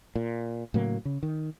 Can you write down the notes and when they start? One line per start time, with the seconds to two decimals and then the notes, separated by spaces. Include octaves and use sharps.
0.16 A#2
0.74 A2 C#3 F#3 A#3
1.05 C#3
1.23 D#3